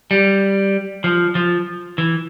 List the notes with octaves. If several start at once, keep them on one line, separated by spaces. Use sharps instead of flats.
G3
F3
F3
E3